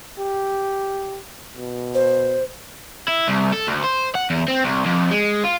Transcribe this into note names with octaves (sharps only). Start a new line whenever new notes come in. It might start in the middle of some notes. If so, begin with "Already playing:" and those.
G4
B2
C5
E4
C2
A4
D2
C5
F#5
E2
C4
C2
F2
G#3
F4